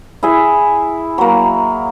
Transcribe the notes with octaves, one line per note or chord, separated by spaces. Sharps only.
E4 G#4 E5
F#3 A#3